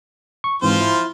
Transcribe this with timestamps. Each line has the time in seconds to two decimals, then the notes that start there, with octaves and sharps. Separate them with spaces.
0.44 C#6
0.62 G#2 E3 F3 C4 F4 C5
0.81 E4